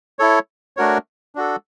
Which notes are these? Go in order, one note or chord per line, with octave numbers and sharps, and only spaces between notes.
E4 A4 C#5
A3 D4 F#4 A#4 C#5
D4 F#4 A4